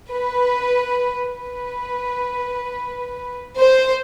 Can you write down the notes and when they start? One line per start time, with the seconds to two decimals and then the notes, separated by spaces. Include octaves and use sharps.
0.10 B4
1.26 B4
3.58 C5